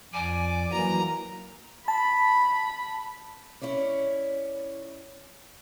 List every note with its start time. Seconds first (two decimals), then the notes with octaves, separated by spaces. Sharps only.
0.13 F2 D5 G#5 D6
0.72 E3 F#3 A#3 A#5
1.88 A5 B5
3.61 C#4 E4 C#5 D5